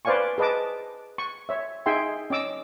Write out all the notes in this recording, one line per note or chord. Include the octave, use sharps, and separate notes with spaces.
B4 C5 D5 F5 G#5 C#6
G#4 B4 D#5 A5 D6
C#6
C#5 E5
D#4 G#4 E5 G5 G#5 C6
C#4 D#5 D6 E6